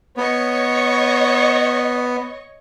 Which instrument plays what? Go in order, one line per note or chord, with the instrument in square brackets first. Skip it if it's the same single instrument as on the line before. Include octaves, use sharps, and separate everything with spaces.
[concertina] B3 [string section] C#5 D#5 C#6